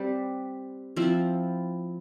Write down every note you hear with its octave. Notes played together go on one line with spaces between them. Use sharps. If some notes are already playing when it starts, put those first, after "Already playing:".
Already playing: G3 C4 G4 B4
F3 C4 E4